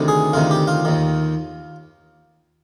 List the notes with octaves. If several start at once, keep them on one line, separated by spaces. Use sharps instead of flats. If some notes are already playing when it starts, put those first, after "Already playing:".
Already playing: D2 C3 D#3
G#4
D2 C3 D#3 F4
G4
F4
D#2 D#3